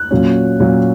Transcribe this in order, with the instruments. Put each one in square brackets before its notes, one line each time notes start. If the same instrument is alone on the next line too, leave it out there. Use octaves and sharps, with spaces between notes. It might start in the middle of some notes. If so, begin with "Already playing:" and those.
Already playing: [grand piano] F#6
A#2 F#3 C#4
A#2 F#3 C#4